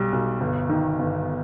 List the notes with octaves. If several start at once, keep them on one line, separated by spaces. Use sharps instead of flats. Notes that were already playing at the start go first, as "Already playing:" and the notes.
Already playing: B1 G3
B1
G1
D#3
G1